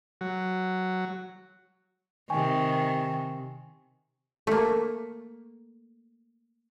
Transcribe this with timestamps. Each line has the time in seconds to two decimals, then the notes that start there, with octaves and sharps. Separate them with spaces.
0.21 F#3
2.30 C3 D#3 G5 G#5 C#6
4.47 A3 A#3